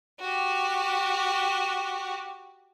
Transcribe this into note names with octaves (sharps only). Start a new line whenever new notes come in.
F#4 G4